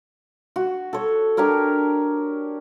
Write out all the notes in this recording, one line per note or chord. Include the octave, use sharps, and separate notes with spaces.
F#4
A4 C#5
D4 G4 A#4 C#5